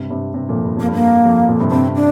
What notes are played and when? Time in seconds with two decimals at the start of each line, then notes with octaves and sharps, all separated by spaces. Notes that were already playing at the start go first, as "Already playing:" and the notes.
Already playing: G2 C3
0.10 G2 C3
0.34 G2 C3
0.49 F2 A#2
0.64 G2
0.77 F2 A#3
0.88 G2
0.94 A#3
1.25 F2
1.48 F2 A#2
1.60 G2 C3
1.71 G2 C3 C4
1.95 D4